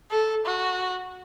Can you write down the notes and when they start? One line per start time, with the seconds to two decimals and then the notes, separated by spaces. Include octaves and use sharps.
0.11 A4
0.46 F#4